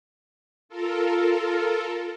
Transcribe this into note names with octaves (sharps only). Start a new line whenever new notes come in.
F4 A4 A#4